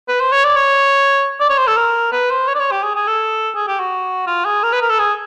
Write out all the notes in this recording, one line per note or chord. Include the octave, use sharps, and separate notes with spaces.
B4
C5
C#5
D5
C#5
D5
C#5
C5
A4
A#4
B4
C5
C#5
D5
C#5
G4
G#4
G#4
A4
G#4
G4
F#4
F4
G#4
A#4
B4
A#4
A4
G#4